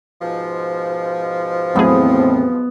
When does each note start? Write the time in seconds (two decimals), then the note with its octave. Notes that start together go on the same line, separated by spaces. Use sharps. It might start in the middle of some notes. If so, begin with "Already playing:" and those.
0.22 G#2 B2 F3
1.76 E2 A2 F#3 A3 B3 C4 G#4